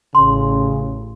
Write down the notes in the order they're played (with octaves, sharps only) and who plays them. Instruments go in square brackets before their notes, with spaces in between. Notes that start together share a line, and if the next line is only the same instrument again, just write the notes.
[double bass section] A1 [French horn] C#3 [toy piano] C6